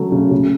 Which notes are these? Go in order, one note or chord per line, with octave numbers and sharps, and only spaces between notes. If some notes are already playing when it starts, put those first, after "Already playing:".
Already playing: C#3 F#3 A3
C#3
C#3